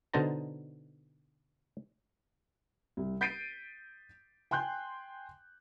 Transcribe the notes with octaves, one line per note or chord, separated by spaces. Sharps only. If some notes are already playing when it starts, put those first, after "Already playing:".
B2 D3 D#4 C5 A5 A#5
C2
G6 A6 B6 C7 D7 D#7
G5 G#5 C6 F#6 G6